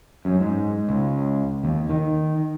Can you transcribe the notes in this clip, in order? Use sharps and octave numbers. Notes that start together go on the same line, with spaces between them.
F#2
G#2
C#2
D#2
D#3